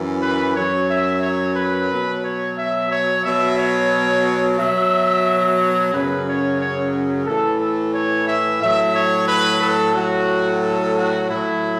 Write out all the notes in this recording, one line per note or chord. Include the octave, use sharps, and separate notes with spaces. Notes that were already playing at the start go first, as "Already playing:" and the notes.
Already playing: F#2 E3
B4
F#2 F#3 C#5
E5
C#5
B4
B2 F#3
C#5
E5
C#5
B2 F#3 E5
C#5
B2 F#3 E5
C#5
F#2 C#3 F#3 B4
C#5
C#5
A2 E3 A4
A4
C#5
E5
A2 F#3 E5
C#5
B4
A4
A2 F#3 F#4
A4
F#4
A2 F#3 E4